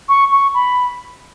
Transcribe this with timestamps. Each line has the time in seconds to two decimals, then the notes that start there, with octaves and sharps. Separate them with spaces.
0.09 C#6
0.32 C#6
0.54 B5